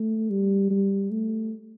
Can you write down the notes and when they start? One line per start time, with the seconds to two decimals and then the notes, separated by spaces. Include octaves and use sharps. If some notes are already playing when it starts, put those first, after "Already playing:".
Already playing: A3
0.30 G3
0.71 G3
1.11 A3